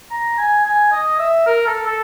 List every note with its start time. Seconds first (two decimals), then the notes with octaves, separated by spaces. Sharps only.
0.11 A#5
0.38 G#5
0.65 G#5
0.92 D#5
1.19 E5
1.46 A#4
1.66 A4
1.86 A4